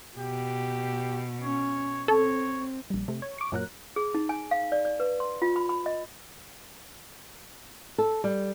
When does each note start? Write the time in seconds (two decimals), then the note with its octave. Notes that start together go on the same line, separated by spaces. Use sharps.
0.18 B2 G4
1.42 C#4 C#5
2.08 C4 A4 C#5
2.90 A#1 G3
3.08 C3 A3
3.22 C#5
3.38 C#6 D6
3.52 F#2 A#2 F#3 A#4 F#6
3.96 G#4
4.14 D#4
4.29 G#5
4.51 F5
4.72 D5
4.85 D5
5.00 B4
5.20 C6
5.42 F4
5.56 B5
5.69 B5
5.86 D#5
7.98 A4
8.24 G3